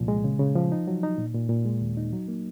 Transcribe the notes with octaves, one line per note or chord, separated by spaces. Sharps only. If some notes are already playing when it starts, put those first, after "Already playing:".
Already playing: C2 A#2 F3
G#3
C#3
C#3
F3
D#4
F#3
D#4
A#2
A#2
A#2
G#3
D#2
D#4
F#3
A#3